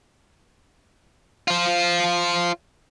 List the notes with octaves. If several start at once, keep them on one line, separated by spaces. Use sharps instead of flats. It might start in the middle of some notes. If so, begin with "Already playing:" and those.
F4 C5